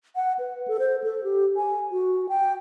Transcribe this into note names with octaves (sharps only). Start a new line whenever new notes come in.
F#5
B4
A4
C5
A4
G4
G#5
F#4
G5